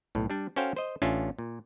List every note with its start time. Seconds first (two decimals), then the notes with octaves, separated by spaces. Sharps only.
0.15 B1 A2
0.30 G3 D4
0.56 C#4 F#4 A4 C5 F5 G5
0.77 C5 D#5
1.02 A1 C#4 D4 F4 E5
1.39 A#2